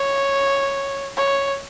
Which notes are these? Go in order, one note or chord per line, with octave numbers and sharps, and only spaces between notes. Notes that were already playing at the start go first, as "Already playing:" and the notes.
Already playing: C#5
C#5